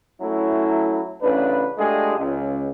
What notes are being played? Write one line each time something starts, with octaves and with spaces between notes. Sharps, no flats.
F#3 A3 C#4 E4
A1 C#3 D4 B4
G#3 A3 D4 F4 G4 G#4
C#2